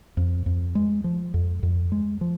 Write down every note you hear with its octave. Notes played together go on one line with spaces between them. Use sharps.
F2
F2
G#3
F3
F2
F2
G#3
F3